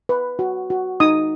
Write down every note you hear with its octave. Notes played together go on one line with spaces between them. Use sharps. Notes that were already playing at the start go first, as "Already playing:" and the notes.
B4
F#4
F#4
D#4 D#6